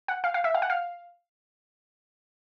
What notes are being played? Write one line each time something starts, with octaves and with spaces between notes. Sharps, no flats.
F#5
F5
F5
E5
F5
F#5
F5